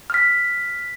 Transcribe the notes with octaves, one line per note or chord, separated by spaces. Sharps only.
F6 B6